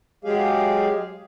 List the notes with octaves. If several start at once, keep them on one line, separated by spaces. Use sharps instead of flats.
F#3 G#3 G4 G#4 F5